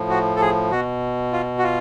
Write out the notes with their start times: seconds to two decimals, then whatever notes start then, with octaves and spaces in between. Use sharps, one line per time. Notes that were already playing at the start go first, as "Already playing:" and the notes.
Already playing: A2 F3
0.10 F#4
0.36 A4
0.41 G#4
0.71 B2 F#4
1.33 F4
1.59 F#4
1.63 F4